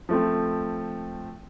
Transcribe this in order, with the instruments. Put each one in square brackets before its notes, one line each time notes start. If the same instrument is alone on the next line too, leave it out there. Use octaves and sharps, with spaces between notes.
[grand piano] F3 A3 C4